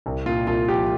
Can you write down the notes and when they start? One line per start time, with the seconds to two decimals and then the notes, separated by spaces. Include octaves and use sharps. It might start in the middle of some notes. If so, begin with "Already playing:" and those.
0.06 C2
0.26 A#2 F4
0.47 C2 F4
0.68 F3 G4